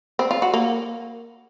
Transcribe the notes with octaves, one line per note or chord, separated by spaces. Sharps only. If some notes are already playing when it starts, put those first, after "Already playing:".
C4
F4
F#4
A#3